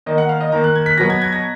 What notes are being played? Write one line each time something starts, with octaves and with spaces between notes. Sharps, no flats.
D#3 A#3 D#5
F#5
F5
D#5
D#3 A#3 A#5
F#6
G#6
B6
B2 F#3 B3 A#6
G#6
G#6
A#6